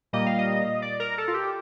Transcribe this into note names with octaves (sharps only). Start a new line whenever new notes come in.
A#2 G3 A#3 D#5
F5
D#5
D5
A#4
A4
F4
G4